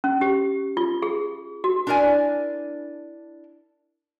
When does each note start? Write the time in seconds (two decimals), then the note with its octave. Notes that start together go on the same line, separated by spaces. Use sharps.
0.04 C#4
0.21 G4
0.77 F4
1.02 G#4
1.64 F#4
1.87 D4 E4 A#4 D5 G#5